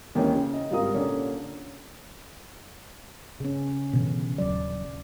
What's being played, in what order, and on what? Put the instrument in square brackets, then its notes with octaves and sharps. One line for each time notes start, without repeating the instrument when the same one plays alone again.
[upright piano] D#2 D#3 E3 C4 C#4
C#3
D#5
G#1 G3 F4 A#4 D#6
A#2 D3 A#3 C#4
[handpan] C#3 C#4
[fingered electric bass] B2 D3 E3
[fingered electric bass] D#1 F#3 [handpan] D5